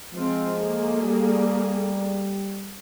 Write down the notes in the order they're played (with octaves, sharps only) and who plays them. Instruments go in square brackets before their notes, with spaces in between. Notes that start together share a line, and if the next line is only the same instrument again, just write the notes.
[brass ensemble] F3 G#3 [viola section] C4 F4
[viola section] A3 A#3 G#4
[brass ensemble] G3